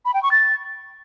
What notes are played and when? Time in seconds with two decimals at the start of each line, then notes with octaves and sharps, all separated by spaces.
0.05 B5
0.14 G5
0.23 C#6
0.32 A6